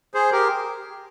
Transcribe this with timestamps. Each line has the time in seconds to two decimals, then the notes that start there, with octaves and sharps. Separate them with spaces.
0.14 G#4 C5
0.32 G4 A#4